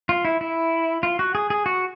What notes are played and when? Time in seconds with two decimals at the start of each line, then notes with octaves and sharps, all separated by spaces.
0.09 F4
0.25 E4
0.41 E4
1.03 F4
1.19 F#4
1.35 G#4
1.50 G#4
1.66 F#4